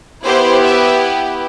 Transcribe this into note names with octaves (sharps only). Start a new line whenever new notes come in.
B3 E4 G4 C5
E5